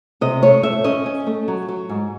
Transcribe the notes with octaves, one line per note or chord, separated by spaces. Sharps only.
C3 D#5
A3 C#5
A3 E5
C#4 D#5
C#4
A3
F#3
F#3
G#2